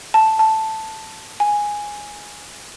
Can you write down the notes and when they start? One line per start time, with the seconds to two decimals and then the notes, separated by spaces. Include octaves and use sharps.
0.14 A5
0.39 A5
1.40 G#5